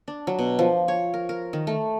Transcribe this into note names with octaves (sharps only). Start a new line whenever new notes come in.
D4
F#3
B2
F3
C#5
A#4
A#4
D#3
A3